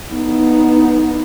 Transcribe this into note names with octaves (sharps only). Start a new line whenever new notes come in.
B3 D#4